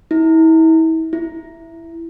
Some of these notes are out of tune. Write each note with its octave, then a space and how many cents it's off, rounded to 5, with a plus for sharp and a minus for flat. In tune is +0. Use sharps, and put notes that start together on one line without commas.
E4 -40
E4 +5